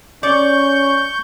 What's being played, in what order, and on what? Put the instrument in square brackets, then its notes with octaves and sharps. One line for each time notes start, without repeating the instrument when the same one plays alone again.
[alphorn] C#4 [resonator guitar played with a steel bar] D5 [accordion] C#6 G6